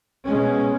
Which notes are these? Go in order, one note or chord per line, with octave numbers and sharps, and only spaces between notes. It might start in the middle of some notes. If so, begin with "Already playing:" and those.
B2 G#3 C#4